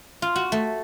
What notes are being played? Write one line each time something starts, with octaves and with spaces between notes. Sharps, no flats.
F4
F#4
A3